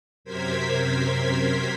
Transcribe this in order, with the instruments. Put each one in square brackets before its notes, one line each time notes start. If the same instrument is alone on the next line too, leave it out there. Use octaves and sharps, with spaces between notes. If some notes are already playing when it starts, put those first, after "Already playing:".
[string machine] F#2 C3 A#4 C5 G#6 B6